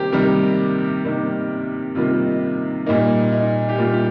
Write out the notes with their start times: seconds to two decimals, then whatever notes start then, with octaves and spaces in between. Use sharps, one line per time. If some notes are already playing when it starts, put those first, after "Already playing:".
Already playing: C3 D#3 G3 A#3 G4 A#4 C5
0.12 C3 D#3 G3 A#3 A#4
1.04 C3 D#3 G3 A#3
1.95 C3 D#3 G3 A#3 F4
2.26 D#4
2.86 A#2 G3 A#3 D#4
3.32 D#4
3.69 G4
3.78 A#2 G3 A#3 F4
3.93 G4